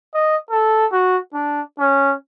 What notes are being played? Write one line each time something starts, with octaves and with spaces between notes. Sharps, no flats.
D#5
A4
F#4
D4
C#4